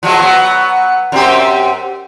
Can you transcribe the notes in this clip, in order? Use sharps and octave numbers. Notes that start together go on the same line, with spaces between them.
F3 F#3 G#3
F#3 B3
F#2 C4 G4